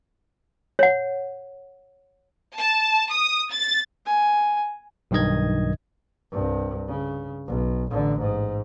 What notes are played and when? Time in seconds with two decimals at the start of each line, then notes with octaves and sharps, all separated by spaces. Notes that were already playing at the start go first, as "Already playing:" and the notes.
0.79 C#5 F#5
2.57 A5
3.12 D#6
3.52 A6
4.06 G#5
5.11 B1 G2 D#3 D#5 G#6
6.32 C2 G2
6.88 C#3
7.48 B1
7.91 A1 D3
8.20 G#2